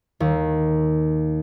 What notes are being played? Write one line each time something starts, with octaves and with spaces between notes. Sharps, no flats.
D#2